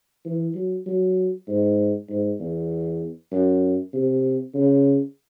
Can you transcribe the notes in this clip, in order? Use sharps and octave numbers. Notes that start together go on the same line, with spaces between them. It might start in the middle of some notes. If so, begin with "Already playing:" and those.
E3
F#3
F#3
G#2
G#2
E2
F#2
C3
C#3